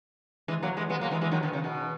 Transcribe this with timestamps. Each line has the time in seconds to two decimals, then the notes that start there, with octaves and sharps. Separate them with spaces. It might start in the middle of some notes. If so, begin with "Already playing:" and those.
0.48 E3 G#3
0.63 F#3 A#3
0.77 E3 G#3
0.90 G#3 B3
1.01 F#3 A#3
1.11 E3 G#3
1.21 E3 G#3
1.32 D#3 F#3
1.43 B2 D#3
1.53 C#3
1.64 B2